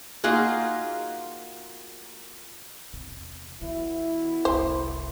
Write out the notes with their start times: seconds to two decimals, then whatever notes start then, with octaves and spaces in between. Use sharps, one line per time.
0.24 A#3 D#4 F4 F#4 G#4
2.93 E2 C3
3.61 B2 E3 B3 E4
4.45 F1 C2 C5